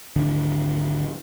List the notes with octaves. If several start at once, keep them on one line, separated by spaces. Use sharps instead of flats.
G#1 D2 D3